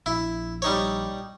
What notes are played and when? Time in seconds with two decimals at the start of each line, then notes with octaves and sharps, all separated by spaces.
0.06 A#1 E4
0.62 G3 D#4 C#5